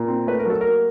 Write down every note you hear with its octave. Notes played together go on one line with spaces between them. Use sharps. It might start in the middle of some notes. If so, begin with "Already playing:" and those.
Already playing: A#2
C4
A3 B4
A#4
F#3 A4
A#3 A#4